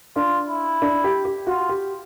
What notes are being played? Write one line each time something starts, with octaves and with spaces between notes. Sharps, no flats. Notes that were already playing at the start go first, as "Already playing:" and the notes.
D4 F4
E4
D4
G4
G4
F4 F#4
G4